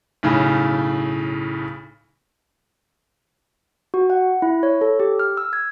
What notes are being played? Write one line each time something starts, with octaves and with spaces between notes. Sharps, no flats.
B1 A2 C#3
F#4
F#5
E4
C#5
A4
G4
F6
E6
G#6